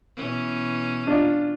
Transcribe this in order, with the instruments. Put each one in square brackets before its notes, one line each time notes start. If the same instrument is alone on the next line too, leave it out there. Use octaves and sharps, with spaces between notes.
[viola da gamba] B2 E3 C#4
[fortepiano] D4 F4